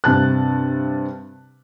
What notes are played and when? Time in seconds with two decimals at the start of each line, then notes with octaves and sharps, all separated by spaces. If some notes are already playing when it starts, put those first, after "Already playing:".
0.04 G2 C3 A5 F#6